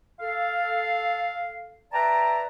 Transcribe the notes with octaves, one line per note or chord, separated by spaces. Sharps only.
A4 F5
B4 D5 E5 G5 A5 A#5